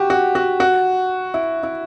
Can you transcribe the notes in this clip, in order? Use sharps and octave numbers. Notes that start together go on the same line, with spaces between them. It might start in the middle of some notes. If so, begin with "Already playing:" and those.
Already playing: F#4 G4
F#4
F#4
F#4
E4
E4